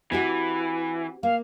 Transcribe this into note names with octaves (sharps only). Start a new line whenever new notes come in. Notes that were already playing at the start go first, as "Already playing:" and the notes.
E3 C4 F#4 G4
A#3 F5